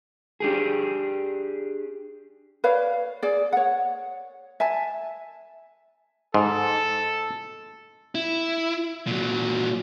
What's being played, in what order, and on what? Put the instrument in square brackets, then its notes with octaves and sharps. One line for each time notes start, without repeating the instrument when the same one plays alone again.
[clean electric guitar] D4 G4 G#4
[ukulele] B4 C#5 D5 F5
G#4 D5
C#5 F#5
E5 G#5 A5
[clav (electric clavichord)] G#2 [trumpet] A4
[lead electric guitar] E4
A#2 F#3